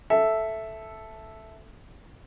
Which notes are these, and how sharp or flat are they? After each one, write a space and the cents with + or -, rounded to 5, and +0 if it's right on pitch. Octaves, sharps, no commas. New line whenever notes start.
A4 -5 E5 +0